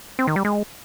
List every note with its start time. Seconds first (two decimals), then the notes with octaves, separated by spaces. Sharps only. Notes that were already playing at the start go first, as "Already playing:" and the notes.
0.19 C4
0.27 D#3
0.36 G3
0.45 G#3